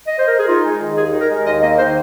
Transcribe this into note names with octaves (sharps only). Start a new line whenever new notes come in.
D#5
C5
A#4
G#4
D#4 F4
G#3
D#3
D#2 G#4
D#4
A#4
G#3
D#2 D#5
A#3 D#5
D#3 C5